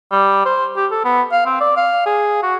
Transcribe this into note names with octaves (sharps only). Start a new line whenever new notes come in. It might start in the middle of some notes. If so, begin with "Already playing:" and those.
G3
C5
G4
A4
B3
F5
C4
D5
F5
G#4
F#4